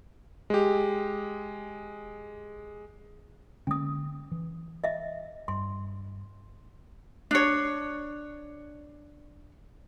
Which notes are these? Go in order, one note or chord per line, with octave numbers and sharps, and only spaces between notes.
G#3 G4
D3 G#3 A#3 C#4 D#6
E3
D#5 E5
G2 C6
D4 C#5